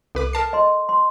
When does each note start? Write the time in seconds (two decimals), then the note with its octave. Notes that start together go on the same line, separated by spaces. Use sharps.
0.15 C2 A4 B4 D6
0.33 A#4 A5 C7
0.53 D#5 C6
0.89 C6